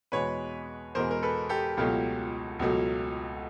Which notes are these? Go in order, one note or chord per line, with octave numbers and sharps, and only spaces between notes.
E2 B2 G#3 B4 C#5
E2 B2 G#3 A#4 C5
A#4
A4 B4
G4 A4
C#2 B2 F#3 A3 F4 G4
C#2 B2 F#3 A3